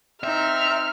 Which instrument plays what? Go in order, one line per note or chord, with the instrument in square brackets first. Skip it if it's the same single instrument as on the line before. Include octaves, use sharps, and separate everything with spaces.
[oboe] C4 [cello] D#4 [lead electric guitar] E5 [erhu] F6